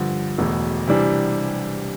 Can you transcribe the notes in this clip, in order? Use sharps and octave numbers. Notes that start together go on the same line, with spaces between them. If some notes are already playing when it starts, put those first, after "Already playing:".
Already playing: G2 D3 F3
E1 E2 B2 A3
C3 E3 G3 D4